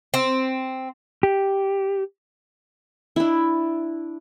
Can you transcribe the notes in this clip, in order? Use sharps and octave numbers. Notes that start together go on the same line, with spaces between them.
C4
G4
D4 E4